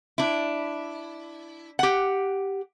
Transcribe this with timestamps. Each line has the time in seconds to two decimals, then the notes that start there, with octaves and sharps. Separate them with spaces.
0.18 D4 E4
1.79 G4 F#5